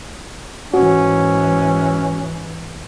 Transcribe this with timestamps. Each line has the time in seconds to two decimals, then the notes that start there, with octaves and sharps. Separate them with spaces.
0.74 G#2 E3 C#4 F#4